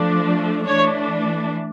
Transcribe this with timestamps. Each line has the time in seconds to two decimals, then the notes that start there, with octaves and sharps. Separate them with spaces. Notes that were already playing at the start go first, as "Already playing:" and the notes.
Already playing: F3 A3 D4
0.65 E3 A3 D4 C#5